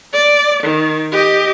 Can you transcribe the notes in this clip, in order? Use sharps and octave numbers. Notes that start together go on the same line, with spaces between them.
D5
D#3
G4 D#5